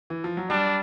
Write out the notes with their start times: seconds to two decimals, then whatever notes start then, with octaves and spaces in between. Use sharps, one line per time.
0.10 E3
0.24 F3
0.37 F#3
0.50 G3 D4